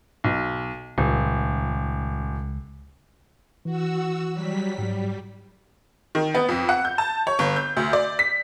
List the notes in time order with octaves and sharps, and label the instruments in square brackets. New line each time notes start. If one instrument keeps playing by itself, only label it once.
[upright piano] B1
[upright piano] D#1 [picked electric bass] C#2
[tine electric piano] E3 [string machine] F#4 E6
[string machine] F#3 G3 B6
[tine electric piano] G#2 F#3 [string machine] G3
[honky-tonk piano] D#3
B3
F2
F#5
G6
A5
C#5
G1
G6
D2
D5
B6